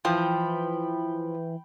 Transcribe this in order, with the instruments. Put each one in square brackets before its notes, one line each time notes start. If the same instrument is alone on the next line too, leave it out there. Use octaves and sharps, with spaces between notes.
[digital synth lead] E3 [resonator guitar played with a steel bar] F3 [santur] G5 B5